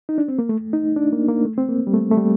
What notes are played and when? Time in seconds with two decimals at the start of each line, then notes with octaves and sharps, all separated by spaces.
0.09 D#4
0.18 D4
0.28 C4
0.39 A#3
0.49 A3
0.73 D#4
0.97 D4
1.13 A#3
1.28 A#3
1.45 A3
1.58 C4
1.69 A#3
1.87 G3
1.93 A3
2.11 A3
2.17 G3